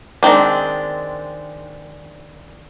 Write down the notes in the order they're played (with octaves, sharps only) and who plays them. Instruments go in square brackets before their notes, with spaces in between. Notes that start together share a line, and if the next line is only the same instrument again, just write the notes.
[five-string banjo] D#3 G#3 C4 D4